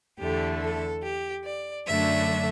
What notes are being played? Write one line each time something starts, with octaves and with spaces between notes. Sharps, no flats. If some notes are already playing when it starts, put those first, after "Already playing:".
E2 D3 A3 G4
A4
G4
D5
F#2 D3 F#3 A3 D4 E5